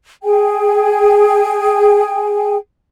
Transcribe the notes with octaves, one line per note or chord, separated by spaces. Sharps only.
G#4 G5 G#5